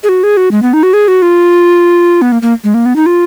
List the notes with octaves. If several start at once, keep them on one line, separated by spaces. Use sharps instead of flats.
G#4
F#4
G#4
F#4
G#3
B3
D#4
F#4
G#4
F#4
F4
B3
A#3
A#3
G#3
A#3
B3
D#4
F4